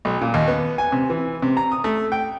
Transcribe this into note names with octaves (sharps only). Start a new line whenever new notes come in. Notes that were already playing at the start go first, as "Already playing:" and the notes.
B1
A#2
D#2
B3
G#5
C3
E3
C3
A#5
D#6
A3
G5